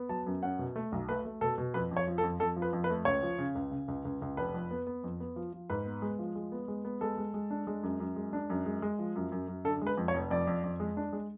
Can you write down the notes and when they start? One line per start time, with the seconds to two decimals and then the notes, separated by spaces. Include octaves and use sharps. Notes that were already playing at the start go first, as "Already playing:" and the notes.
Already playing: B3
0.09 F#3 A5
0.26 F#2
0.43 C#4 F#5
0.59 B2
0.76 A3
0.92 B1
1.08 A3 B4
1.25 A3
1.41 B2 A4
1.58 B2
1.74 F2 B4
1.91 F2
1.97 C#5
2.07 F3
2.18 A4
2.23 F2
2.40 F2 A4
2.56 F3
2.62 B4
2.73 F2
2.84 B4
2.90 A3
3.05 C#2 C#5
3.23 F3
3.39 C#3
3.55 C#2
3.71 C#3
3.88 C#2
4.05 C#2
4.22 C#2
4.37 F1 B4
4.54 F2
4.71 B3
4.87 B3
5.04 F2
5.20 B3
5.36 F3
5.53 F3
5.70 G#2 B4
5.86 B3
6.02 G#3
6.19 F3
6.35 G#3
6.52 B3
6.68 G#3
6.85 B3
7.01 G#3 A4
7.18 G#3
7.34 G#3
7.51 D4
7.67 G#3
7.83 F#2
8.00 F#2
8.16 G#3
8.33 D4
8.50 F#2
8.66 G#3
8.82 G#3
8.99 F3
9.16 F#2
9.32 F#2
9.48 F#2
9.65 D3 A4
9.81 G#3
9.87 B4
9.97 F2
10.08 C#5
10.14 F1
10.31 F2 D5
10.47 F2
10.64 F2
10.80 G#3
10.97 D4
11.13 G#3